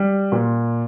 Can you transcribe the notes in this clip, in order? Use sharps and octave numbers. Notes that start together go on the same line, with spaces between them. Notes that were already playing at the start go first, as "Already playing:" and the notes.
Already playing: G3
A#2